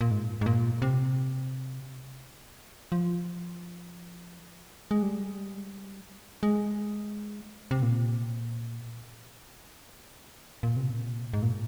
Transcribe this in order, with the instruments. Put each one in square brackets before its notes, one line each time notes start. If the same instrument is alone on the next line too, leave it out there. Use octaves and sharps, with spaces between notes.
[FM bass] A#2
G#2
G#2
A#2
C3
F3
G#3
G3
G#3
C3
A#2
A#2
C3
A#2
G#2
A#2